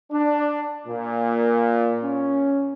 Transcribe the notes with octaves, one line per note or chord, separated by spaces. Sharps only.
D4
A#2
C#4